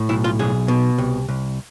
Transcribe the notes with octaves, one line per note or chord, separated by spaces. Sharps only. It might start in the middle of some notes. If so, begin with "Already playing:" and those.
Already playing: A2
B1 E4
F4
B1 G#4
B2
C2
C2